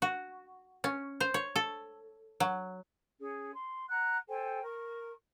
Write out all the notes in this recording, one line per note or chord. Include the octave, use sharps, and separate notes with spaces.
F#4
C#4
C5
C#5
A4
F#3
C#4 G#4
C6
F#5 A#5 F#6
A4 C5 G5 G#5
A#4 C#6